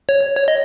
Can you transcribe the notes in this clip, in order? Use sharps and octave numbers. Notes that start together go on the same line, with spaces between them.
C#5
C#5
D#5